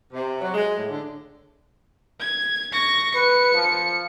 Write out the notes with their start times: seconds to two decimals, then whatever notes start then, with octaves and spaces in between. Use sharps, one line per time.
0.13 C3
0.41 F#3
0.54 G#3
0.77 A2
0.88 D3
2.20 G#6
2.73 C#6 A#6
3.14 B4 C#7
3.54 F3